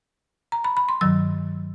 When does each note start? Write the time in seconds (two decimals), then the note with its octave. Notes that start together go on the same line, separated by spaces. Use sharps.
0.52 A#5
0.64 B5
0.77 B5
0.89 C6
1.01 G2 D#3 F#3 E6